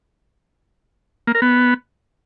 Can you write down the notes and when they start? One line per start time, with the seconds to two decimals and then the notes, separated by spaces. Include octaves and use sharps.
1.27 A#3
1.35 A#4
1.42 B3